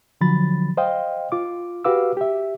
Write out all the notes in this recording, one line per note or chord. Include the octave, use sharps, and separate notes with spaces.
D3 F3 F#3 B5 A6
C5 D#5 F5 G5
F4 D6
F#4 G4 B4 F5 D6 E6
G4 E5